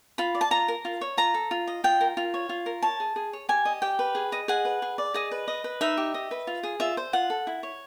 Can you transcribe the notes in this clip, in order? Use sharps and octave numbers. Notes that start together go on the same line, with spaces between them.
F4 B5
D5
A5
F4 A#5
A#4
F4
C#5
F4 A#5
A4
F4
D#5
F4 G5
A#4
F4
C#5
F4
A#4
C#5 A5
G#4
G#4
C#5
G4 G#5
D#5
G4 G5
B4
G#4
D#5
G#4 F#5
B4
G#4
D5
G#4 D#5
B4
D#5
B4
D#4 E5
G4
D#5
B4
F4
G#4
F4 E5
C5
F4 F#5
A4
E4
C#5